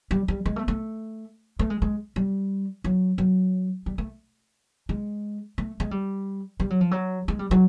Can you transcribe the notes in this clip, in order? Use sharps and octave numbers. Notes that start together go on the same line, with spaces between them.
G3
G3
G#3
A3
A3
A3
G#3
G#3
G3
F#3
F#3
G3
A3
G#3
A3
G#3
G3
G3
F#3
F3
F#3
G#3
G3
F#3